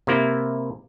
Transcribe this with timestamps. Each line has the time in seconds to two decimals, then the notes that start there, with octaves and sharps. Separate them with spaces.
0.07 C3 A#3 E4